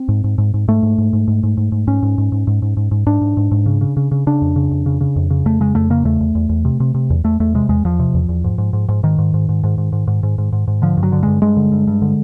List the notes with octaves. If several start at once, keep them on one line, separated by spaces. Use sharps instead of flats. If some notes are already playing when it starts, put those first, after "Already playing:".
Already playing: C4
G#2
G#2
G#2
G#2
G#2 A3
G#2
G#2
G#2
G#2
G#2
G#2
G#2
G#2 C#4
G#2
G#2
G#2
G#2
G#2
G#2
G#2
G#2 D4
G#2
G#2
G#2
C#3
C#3
C#3
C#3
C#3 D4
F2
C#3
F2
C#3
C#3
F2
C#3
F2 A3
C#3 G#3
F2 A3
C#3 A#3
E2 A3
E2
E2
E2
C3
C3
C3
E2
E2 A3
E2 A3
C3 G#3
E2 G#3
E2 F3
C3
E2
E2
G#2
G#2
G#2
G#2
G#2 D#3
G#2
G#2
G#2
G#2
G#2
G#2
G#2
G#2
G#2
G#2
G#2
D3 F3
G2
F#3
D3
G2 G#3
G2 G#3
D3
G2
G2
D3